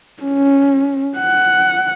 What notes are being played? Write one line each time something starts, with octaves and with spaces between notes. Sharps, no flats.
C#4
F#5